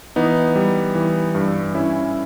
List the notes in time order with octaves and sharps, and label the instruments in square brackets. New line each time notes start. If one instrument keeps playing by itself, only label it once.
[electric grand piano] E3 B3 D#4
G3
E3
G2
G2 C#4 E4